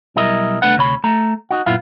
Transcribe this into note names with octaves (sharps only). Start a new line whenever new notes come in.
B1 G3 E4 A#4 D#5
C2 A3 D4 B4 F#5
D2 C3 C#5 B5
A3 A#5
D#4 F#4
F#2 A#2 B3 E4 F4 F5